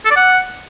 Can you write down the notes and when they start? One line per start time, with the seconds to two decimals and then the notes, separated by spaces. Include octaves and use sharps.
0.05 A4
0.11 D5
0.17 F#5